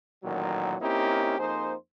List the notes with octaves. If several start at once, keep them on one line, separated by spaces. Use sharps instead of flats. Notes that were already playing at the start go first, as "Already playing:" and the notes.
A1 A#2 D#3 F#3
A#3 C4 C#4 D#4 E4 G4
F2 A#3 D#4 G#4 C5